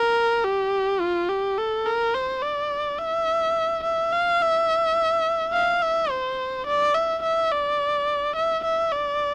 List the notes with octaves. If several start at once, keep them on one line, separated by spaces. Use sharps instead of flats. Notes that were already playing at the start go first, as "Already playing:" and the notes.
Already playing: A#4
G4
F4
G4
A4
A#4
C5
D5
E5
E5
F5
E5
F5
E5
C5
D5
E5
E5
D5
E5
E5
D5